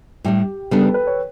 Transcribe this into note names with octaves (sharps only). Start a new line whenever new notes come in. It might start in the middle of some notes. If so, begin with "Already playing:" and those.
A2 G3 D4 G4
C#3 G3 B3 D4 A4
B4
B4
C#5